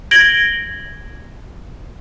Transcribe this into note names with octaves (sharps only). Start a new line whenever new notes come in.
G#6 A#6 D7 F#7 G7